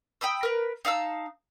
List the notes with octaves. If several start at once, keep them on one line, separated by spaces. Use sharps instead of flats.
G5 B5 D#6 E6
A#4 B4
D#4 F5 A5 E6